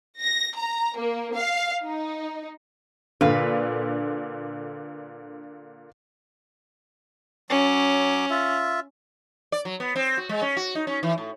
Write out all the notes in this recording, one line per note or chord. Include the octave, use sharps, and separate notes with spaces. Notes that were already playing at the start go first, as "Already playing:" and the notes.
A#6
A#5
A#3
F5
D#4
A#2 D3 B4 F5
F#3 C#4 D6
F4 E5
D5
F#3
B3
C4
F#4
G#3
C#4
F#4
D#4
C#4
E3
A2